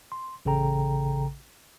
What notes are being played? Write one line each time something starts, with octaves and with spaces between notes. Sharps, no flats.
C6
A1 C#3 A4 G5 A#5